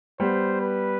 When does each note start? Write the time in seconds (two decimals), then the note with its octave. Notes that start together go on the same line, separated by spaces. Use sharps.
0.20 G3 B3 C5
0.62 B4